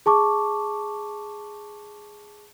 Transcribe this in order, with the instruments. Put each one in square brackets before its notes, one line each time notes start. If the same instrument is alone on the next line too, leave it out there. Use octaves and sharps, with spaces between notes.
[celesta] G#4 A5 C#6 D6